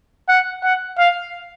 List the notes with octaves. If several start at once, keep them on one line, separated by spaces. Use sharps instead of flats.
F#5
F#5
F5